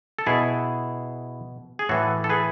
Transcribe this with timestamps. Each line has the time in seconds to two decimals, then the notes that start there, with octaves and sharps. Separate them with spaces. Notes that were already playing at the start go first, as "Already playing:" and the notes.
0.19 A4
0.26 B2 E4 G#4
1.79 G#4
1.89 A2 E3 F#4 A4
2.24 A4
2.29 G#4 B4